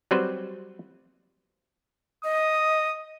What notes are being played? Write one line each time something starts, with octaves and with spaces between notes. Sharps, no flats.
F#3 G3 C4 B4 C5
D#5 D#6